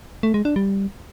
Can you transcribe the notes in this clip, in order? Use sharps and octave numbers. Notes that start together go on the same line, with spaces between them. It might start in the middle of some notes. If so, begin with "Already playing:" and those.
A3
G#3
D4
G3